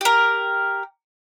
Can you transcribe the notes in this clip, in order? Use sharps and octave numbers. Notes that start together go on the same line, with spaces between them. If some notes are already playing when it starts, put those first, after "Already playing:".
G4 A#4